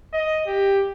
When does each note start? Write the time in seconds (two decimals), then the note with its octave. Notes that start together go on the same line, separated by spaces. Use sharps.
0.13 D#5
0.47 G4